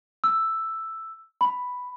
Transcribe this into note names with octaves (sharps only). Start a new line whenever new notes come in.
E6
B5